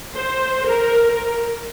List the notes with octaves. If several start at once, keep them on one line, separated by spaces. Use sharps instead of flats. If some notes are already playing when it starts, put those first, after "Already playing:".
C5
A#4